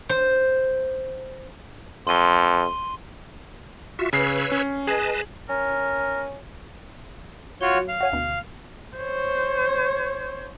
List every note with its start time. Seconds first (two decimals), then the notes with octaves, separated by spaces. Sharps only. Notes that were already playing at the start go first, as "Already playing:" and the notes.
0.09 C5
2.07 F2 C6 D#7 G7
3.99 F4 F#4 E5
4.13 C#3 B4 C#5 E6 C7
4.52 C#4
4.87 G#4 B4 D#5 A5
5.49 C#4 A#4
7.61 F4 F#4 C#5 G6 C7
7.75 F#3
7.89 F5
8.01 F#4 C#5 G#5
8.12 D2 B2
8.97 C5 C#5